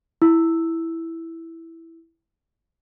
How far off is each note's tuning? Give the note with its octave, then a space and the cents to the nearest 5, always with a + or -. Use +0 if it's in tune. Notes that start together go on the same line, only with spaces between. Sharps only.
E4 +0 E6 +0